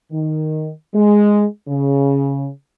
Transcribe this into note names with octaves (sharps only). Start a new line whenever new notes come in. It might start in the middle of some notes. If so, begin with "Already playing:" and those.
D#3
G#3
C#3